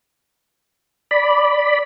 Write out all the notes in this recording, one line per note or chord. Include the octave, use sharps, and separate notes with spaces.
D5 B5